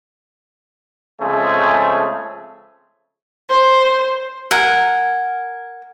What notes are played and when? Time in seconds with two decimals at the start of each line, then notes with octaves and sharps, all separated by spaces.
1.21 C#3 F3 G#3 A3 C4 G#4
3.49 C5
4.51 A#4 F#5 G#5